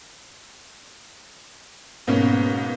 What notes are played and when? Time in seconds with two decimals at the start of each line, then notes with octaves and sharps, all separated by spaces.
2.07 G#2 B2 A#3 C#4